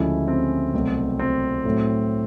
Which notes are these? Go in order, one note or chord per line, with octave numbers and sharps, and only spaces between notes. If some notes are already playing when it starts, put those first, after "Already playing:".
Already playing: D2 C#3 F3 G#3 E4
C4
C2 B2 F#3 A3
C4
A2 F#3 A3